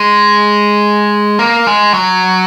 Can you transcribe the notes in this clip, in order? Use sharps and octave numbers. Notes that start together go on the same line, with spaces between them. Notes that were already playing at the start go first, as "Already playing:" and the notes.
Already playing: G#3
A#3
G#3
F#3